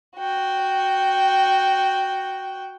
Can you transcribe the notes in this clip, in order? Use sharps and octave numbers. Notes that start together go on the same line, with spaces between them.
F#4 G5